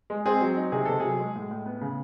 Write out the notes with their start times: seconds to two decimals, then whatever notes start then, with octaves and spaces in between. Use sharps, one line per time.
0.10 G#3
0.26 C4 G#4
0.41 F#3
0.57 D#4
0.72 C3 G#4
0.85 C3 A4
1.00 F#3 G#4
1.19 G#3
1.35 A2
1.51 A2
1.66 B3
1.81 C#3